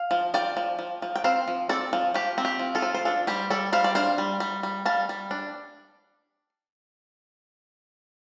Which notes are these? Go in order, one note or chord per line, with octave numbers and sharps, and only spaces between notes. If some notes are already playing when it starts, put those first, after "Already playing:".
Already playing: F5
F3
F3 D5 G5
F3
F3
F3
G5
C4 C5 F5
F3
C4 A4 D5
F3
F3 G4
C4
G4
F3
F4 A4
F3
C5
D4 F4 A4
G3 G4 C5
G3 A4 D5
G3 C5 F5
D5
D4 C5 F5
G3
G3
G3
G3 F5 A5
G3
D4